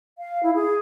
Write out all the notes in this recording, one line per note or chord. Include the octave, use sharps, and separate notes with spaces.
F5
E4
G#4